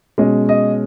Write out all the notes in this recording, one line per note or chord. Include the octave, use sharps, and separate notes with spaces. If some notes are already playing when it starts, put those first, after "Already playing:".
B2 G#3 C#4 D#5
D#5